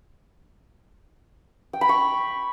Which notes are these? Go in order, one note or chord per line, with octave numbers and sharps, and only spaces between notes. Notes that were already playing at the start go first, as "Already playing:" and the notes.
G5
B5
C#6